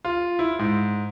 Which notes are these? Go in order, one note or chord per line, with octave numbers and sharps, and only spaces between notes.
F4
E4
G#2